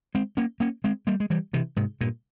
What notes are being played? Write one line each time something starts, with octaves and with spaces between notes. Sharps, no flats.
G#3 C4
A#3 C#4
A#3 C#4
G#3 C4
G3 A#3
G#3
E3 G3
C3 E3
G#2 C3
G2 A#2